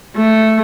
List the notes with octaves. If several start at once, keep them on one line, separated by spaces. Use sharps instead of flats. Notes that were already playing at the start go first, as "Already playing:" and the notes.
A3